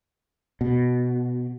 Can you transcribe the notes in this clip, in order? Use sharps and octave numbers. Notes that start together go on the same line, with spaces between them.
B2